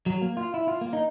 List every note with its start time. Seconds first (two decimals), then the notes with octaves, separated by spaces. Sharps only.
0.06 F#3
0.22 A#3
0.37 F4
0.54 E4
0.68 F4
0.81 A#3
0.93 D#4